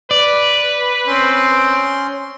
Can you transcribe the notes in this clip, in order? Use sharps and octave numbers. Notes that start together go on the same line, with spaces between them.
B4 D5
C4 C#4 C6